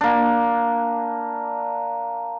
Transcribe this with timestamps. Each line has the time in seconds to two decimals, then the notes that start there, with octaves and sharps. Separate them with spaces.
0.01 A#3 D4